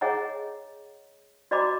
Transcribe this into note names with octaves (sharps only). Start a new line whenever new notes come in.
G#4 C#5 D#5 F#5 A#5
F#4 D5 D#5 A#5 B5 D6